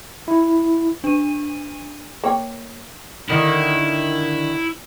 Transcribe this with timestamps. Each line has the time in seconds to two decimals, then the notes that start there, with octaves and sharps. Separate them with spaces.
0.28 E4
1.04 D4 D#7
2.24 A#3 C#5 G5
3.30 D3 D#3 E4